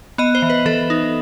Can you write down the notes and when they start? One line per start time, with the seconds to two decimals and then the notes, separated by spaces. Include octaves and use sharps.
0.18 B3 D#5
0.35 C5
0.42 E3
0.50 B4
0.65 E3 A4
0.90 D#4